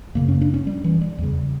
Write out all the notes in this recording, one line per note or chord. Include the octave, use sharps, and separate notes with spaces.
F#2 C#3 A#3
C#4
D4
C#4
G3
E3
G3
E2 C#3